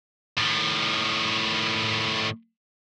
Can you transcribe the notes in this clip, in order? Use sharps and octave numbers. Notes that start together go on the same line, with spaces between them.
A2 D#3